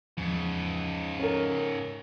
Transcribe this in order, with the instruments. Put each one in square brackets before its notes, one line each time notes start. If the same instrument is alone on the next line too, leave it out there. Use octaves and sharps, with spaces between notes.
[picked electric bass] E2 F3 [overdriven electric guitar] G#2 C#3
[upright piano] C#4 A#4